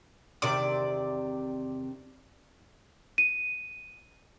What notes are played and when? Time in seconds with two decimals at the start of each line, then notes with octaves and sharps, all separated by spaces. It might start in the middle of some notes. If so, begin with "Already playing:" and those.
0.42 E2 C3 D#3 D5
3.18 D#7